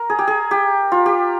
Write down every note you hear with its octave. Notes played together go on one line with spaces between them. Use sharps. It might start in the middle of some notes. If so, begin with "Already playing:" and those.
Already playing: A#4
G#4
G4
G#4
G4
F4
G4